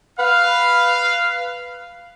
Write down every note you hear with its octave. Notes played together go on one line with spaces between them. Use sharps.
B4 F5